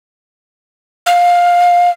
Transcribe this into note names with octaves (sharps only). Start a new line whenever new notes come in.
F5